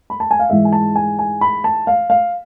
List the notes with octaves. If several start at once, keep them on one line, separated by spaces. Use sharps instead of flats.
B5
A5
G#5
F5
G#2 E3 G#3 E5
G#5
A5
G#5
G#5
B5
A5
F5
F5